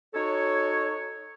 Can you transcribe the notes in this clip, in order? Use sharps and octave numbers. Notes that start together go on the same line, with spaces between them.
D#4 F#4 A4 C#5